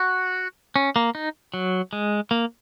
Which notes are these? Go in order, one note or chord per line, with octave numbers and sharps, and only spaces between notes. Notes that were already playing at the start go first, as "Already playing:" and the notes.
Already playing: F#4
C#4
A#3
D#4
F#3
G#3
A#3